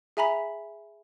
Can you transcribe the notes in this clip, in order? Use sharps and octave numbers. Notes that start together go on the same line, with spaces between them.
G#4 E5 G#5 A#5 B5 B6